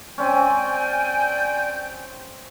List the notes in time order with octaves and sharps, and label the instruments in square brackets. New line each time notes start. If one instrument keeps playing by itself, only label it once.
[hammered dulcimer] C4 C#4 [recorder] D5 [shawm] G5 [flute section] G#5